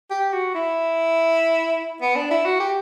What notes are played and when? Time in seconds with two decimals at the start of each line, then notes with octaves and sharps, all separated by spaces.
0.10 G4
0.32 F#4
0.54 E4
2.01 B3
2.16 D4
2.31 E4
2.45 F#4
2.60 G4